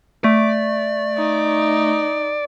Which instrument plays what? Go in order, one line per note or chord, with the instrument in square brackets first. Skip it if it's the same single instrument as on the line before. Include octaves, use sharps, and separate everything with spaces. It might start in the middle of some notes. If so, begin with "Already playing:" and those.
[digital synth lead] A3 [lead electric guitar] D5
[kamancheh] D#4